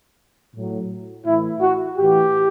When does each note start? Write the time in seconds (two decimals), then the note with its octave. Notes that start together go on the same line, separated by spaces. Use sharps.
0.53 A2 F#3
1.25 A2 E3 E4
1.61 F#4
1.97 A2 E3 G4